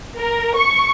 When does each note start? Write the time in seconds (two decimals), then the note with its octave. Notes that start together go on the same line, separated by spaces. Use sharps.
0.16 A#4
0.56 C#6